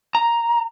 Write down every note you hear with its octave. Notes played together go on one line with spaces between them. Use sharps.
A#5